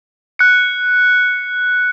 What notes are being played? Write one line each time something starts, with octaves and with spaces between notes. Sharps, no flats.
F#6 C#7